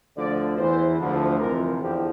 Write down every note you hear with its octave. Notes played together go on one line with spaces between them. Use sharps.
D2 D3 F3 D5
E2 E3 C5
D2 D3 F3
F2 C3 E3 A#4
E2 D3 F3 G4